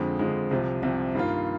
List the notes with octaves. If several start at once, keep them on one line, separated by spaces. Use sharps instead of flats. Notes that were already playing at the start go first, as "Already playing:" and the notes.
Already playing: F2 D3 F3 G#3
F2 D3 F3 G#3
C2 C3 F3
C2 C3 F3
G2 D#3 A#3 F4